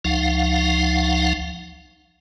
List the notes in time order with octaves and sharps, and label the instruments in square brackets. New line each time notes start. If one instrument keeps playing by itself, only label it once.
[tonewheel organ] C#2 F3 D#4 F5 F#5